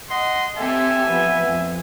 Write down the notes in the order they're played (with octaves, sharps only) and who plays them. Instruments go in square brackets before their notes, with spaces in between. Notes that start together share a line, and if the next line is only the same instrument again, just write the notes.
[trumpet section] D#5 F#5 C6
[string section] C4 G4 A4 [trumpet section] E5 G#5
[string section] F3 B3
F2